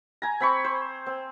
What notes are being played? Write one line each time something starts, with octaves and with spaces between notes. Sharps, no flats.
G#5 A#5
C4 B5 C#6
C5
C4